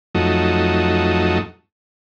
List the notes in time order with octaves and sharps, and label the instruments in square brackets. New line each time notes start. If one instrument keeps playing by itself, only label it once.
[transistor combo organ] F2 F#3 A3 D#4